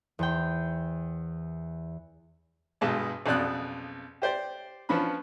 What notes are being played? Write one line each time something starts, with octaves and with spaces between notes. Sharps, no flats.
E2 C5 G5
B1 G2 G#3 A5
B1 F2 C#3 D5 D#6 F#6
G4 C5 D5
F3 B3 C#4 D4 B5